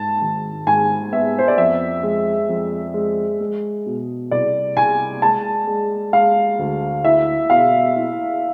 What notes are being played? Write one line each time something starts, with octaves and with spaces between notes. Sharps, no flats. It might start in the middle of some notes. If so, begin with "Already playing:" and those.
Already playing: G#2 A5
G#1
G#2 G#5
B3 E5
C5
D5
F2 E5
G#3
F2
G#3
G#3
B2
C2 D5
C2 G#5
G#3 A5
G#3
G#3 F5
D2
E4 E5
B2 F5
E4